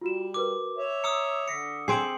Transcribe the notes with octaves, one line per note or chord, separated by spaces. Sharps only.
G3 F4 F#4 E7
F#4 A#4 B4 D6
C#5 E5
A#5 D#6 E6 C#7
D3 B5 A#6 B6 C#7
C4 G#4 G5 C7 D7 F#7